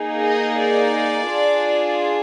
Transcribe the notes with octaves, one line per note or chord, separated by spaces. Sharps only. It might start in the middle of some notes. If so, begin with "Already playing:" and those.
Already playing: A#3 D#4 G#4
D#5
D5
D4 F4 G#4